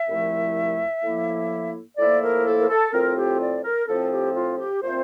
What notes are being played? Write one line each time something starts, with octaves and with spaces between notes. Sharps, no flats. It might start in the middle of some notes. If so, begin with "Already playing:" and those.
Already playing: E5
C2 A#2 F3 A3 E4
A2 F3 A#3 E4
A2 F3 A#3 E4 D5
A#4
A4
A#4
A4
A2 F3 C4 F4 A#4
G4
D5
A#4
A2 F3 C4 F4 A4
G4
F4
G4
A#2 A3 C4 F4 C5